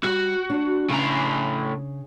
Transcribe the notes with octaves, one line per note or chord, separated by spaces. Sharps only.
G3 F#4
D4
A2 C#3 A#5